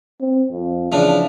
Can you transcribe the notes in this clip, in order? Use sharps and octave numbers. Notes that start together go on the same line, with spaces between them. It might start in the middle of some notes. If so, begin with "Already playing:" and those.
C4
F2
C#3 E3 F3 D4